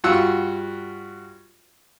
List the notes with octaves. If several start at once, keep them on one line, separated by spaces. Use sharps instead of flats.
G2 F4 F#4 F#5 E6